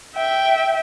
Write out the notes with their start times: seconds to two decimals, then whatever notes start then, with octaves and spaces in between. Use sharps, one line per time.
0.15 E5 G5